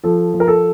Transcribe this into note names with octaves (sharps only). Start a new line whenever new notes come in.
F3 A4
F3
A#4
A4